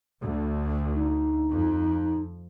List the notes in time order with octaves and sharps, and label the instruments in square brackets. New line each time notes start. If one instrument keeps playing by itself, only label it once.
[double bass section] D2
[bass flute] D#4
[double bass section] F2